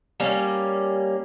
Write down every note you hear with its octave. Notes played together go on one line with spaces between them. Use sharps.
G3 A#3 C#4